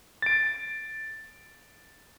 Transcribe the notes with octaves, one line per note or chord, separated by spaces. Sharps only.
A6 D7